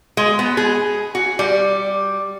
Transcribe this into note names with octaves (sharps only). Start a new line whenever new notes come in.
G#3
B3
G#4
F#4
G3